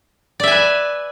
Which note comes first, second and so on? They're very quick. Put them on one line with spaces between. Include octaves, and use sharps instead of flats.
D5 E5 G#5 B4